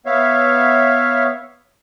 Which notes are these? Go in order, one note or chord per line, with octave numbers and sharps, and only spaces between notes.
B3 C#5 E5 F5